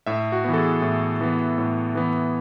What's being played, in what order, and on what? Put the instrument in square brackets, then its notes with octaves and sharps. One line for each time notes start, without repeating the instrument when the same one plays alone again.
[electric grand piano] A2 E5
F#4
E3 B3
A4
G#4
A2
E3 B3
A2
E3 B3